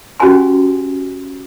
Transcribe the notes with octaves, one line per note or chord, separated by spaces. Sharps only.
C#4 F#4 G4 F#5 G#5 C6